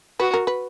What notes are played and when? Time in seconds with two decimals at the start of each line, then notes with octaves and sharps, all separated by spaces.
0.20 F#4 B4
0.34 A#4
0.47 B4